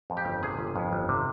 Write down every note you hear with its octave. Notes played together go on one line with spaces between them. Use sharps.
F2
G4
G1
C3 G#4
G1
F2
G1
C3